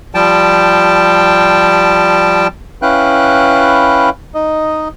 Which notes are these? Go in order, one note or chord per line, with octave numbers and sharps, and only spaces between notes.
F3 G3 G5 A5
C#4 E4 B4 F5 G5 F#6
D#4 D#5